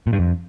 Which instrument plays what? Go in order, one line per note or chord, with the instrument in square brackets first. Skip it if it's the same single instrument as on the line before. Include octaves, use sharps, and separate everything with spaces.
[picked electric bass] A#2
G2
F2